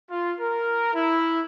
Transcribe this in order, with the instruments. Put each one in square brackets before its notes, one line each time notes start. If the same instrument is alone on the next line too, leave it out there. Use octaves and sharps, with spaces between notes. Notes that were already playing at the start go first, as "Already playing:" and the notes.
[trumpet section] F4
A#4
E4